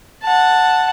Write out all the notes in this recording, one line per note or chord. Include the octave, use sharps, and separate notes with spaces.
F#5 A5